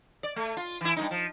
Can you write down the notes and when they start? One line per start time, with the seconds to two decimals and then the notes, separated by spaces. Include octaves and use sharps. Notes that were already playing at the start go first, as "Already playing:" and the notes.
0.23 D5
0.36 A3
0.57 F4
0.81 E3 E4
0.96 G2 C#3 D#4
1.11 F3